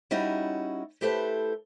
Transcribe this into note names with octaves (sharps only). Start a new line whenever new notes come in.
G3 C#4 D#4 E4 F#4
A3 E4 G4 A4 B4 C5